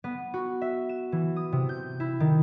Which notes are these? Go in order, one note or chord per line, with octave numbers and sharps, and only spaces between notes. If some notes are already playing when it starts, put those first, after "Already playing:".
B3
F#4
E5
E7
E3
D#6
C3
G6
E4
D#3